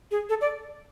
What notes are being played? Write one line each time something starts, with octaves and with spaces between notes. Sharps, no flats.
G#4
A4
D5